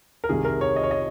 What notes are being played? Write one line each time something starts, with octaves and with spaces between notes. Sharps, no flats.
A#4
C2 C3 D#3 G#4
A#4
C#5
D#5
C#5
D#5